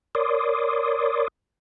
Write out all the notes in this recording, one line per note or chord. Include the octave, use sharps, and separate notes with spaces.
A#4 C#5 D5 C6 D6 D#6